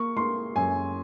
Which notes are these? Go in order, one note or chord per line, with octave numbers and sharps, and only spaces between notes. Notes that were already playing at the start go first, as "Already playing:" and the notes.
Already playing: A#3 C#6
A#3 C6
F#2 G#5